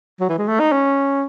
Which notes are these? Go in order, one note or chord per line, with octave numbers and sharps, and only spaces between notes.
F#3
E3
G#3
A3
D#4
C#4